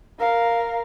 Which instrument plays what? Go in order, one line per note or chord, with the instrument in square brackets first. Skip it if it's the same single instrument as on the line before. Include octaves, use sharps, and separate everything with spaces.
[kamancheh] A#4 F5